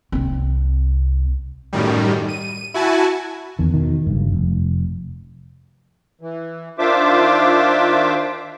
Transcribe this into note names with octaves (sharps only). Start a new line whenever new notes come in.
C2 C4
F#2 A2 D#3 G3
D#7
E4 F#4 G#5 A5
E2 D#3
B2 D#3
F#1 G2
F1
E3
D#3 D4 F4 C5 E5 D6